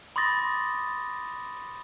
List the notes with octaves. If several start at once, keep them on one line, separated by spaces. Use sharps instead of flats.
B5 C6 D6 D#6 A6 A#6